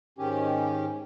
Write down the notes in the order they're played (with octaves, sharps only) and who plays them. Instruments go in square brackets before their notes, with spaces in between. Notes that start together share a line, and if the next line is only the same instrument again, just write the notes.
[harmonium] G#2 D#3 C#4 G4